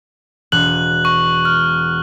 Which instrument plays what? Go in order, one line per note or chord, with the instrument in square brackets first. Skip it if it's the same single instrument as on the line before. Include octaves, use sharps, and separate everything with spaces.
[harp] E1 [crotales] F#6 F#7
[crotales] C#6
F6